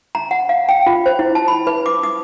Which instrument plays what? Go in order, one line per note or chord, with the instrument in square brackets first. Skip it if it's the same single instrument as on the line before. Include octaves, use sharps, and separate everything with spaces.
[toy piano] A#5
F#5
F5
G5
F4
C5
E4
A5
B5
B4
D6
D#6